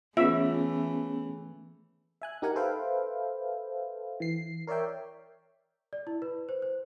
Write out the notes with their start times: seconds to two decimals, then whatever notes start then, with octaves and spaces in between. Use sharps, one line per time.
0.17 E3 A3 B3 C#4 F4 G#4 E5
2.22 E5 G#5 F#6
2.42 D#4 G4 A#4 F#5 G#5
2.56 A4 B4 C5 E5 F5 G5
4.20 E3 C7
4.67 A#4 C#5 D5 E5 G5
5.93 D5
6.07 E4
6.22 B4
6.49 C5
6.62 C5